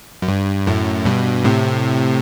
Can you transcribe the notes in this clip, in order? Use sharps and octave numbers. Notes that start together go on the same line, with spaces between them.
F#2
G2
F#2 A2
G2 B2
A2 C3